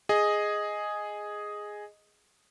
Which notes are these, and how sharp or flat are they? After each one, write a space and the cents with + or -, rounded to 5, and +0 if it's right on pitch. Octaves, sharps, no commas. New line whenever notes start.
G#4 +0 D#5 +0